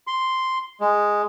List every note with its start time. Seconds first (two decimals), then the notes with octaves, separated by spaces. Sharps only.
0.07 C6
0.81 G#3